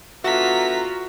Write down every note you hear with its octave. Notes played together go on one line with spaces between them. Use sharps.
D3 B3 F4 F#4 E5 A#5 B6